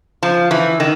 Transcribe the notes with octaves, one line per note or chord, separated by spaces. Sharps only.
F3
E3
D#3